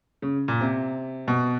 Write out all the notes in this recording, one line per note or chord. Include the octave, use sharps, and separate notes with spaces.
C#3
A#2
C3
B2